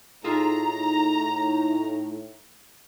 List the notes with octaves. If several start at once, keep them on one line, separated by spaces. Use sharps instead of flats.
A2 D#4 F4 G#4 A4 A#5